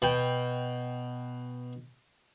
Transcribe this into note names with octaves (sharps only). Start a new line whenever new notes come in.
B2 G5